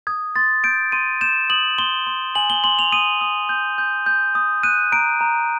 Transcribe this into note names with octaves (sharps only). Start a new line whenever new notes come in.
D#6 G#6
C6 A6
G6 D7
C6 D#7
G6 E7
D#6 F#7
C6 G7
C6
G#5 F#7
G7
C6 F#7
F7
D#6 D#7
D#6
G6
G6
G6
D#6
F#6 D#7
A#5 D7
A#5